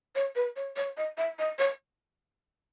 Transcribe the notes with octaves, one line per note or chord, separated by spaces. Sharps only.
C#5
B4
C#5
C#5
D#5
E5
D#5
C#5